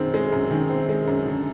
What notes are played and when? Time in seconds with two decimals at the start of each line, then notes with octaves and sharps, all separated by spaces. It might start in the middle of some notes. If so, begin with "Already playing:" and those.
Already playing: F#2 D#3 G#3 C4
0.14 G#3
0.32 F#2
0.51 D#3
0.70 C4
0.89 G#3
1.07 F#2
1.26 D3